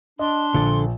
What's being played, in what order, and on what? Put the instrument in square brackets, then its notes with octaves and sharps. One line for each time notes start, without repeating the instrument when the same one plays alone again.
[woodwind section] D4 [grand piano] D#5 [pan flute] C6
[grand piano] A#1 [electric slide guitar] D3 A4